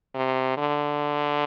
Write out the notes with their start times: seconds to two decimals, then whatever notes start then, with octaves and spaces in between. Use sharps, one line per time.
0.15 C3
0.58 D3